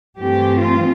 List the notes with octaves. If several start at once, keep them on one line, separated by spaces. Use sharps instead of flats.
G2 E3 A3 C4 G4
F4